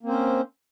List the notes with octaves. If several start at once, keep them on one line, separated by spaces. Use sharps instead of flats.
A#3 C4 C#4 C5